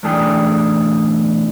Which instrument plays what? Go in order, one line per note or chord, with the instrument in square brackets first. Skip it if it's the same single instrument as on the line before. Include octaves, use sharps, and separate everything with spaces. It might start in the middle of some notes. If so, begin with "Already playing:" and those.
[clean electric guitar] B1 E2 A2 D4 G#4 G5